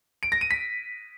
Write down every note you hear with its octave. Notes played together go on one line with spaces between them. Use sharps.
D7
A#6
D#7
B6